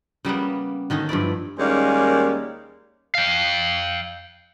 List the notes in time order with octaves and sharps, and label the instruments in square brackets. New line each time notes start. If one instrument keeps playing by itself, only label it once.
[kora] C#3 G3 A#3 B3
D3 D#3 C#4 D#4
G2 F3 E4 D5
[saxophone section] D#2 G3 G#3 A#3 C#4
[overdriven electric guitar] F5 G5